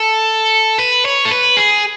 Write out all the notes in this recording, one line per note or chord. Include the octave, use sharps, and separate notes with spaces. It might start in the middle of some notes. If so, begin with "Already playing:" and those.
Already playing: A4
B4
C#5
A4
B4
G#4